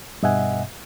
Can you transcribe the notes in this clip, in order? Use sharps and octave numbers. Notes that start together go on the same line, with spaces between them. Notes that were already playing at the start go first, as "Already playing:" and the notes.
G2 B2 D#5 E5 F#5 G#5